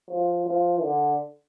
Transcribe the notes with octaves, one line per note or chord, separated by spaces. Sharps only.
F3
F3
D3